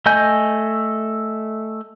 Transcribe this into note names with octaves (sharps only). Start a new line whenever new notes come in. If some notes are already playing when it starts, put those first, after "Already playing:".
A3 D#5 G#5 G6